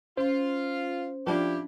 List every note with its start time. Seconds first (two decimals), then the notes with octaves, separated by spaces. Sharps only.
0.17 C#4 F4 C5
1.27 F3 D4 E4 G4